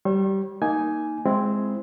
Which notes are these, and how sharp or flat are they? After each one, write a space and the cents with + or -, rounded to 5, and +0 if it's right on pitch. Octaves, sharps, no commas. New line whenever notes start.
G3 -20 C#5 -45 C#6 -45
A#3 +0 D#4 +0 G#5 +5
G#3 +0 C4 +0 E4 +20